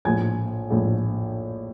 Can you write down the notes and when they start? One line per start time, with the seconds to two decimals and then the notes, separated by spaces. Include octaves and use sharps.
0.05 A#1 A2 F3 G#5 G#6
0.70 A#1 A2 F3